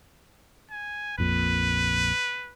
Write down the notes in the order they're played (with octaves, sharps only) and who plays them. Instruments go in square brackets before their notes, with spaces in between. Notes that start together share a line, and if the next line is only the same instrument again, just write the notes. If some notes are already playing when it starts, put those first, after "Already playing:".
[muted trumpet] G#5
[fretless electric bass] A#1 F2 A#2 [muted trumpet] B4